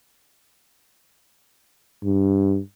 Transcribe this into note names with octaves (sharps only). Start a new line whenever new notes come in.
G2